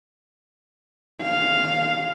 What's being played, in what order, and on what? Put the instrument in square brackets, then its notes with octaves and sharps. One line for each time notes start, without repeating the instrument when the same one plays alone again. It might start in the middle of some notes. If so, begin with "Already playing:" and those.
[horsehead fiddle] F5